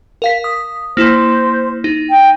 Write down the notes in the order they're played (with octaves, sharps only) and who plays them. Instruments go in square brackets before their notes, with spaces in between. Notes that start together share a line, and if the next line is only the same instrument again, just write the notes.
[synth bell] A#4 F5 B6
D#6
[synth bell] A#3 E4 [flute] C5
[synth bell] D#4
[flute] G5